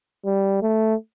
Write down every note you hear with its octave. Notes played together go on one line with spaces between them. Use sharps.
G3
A3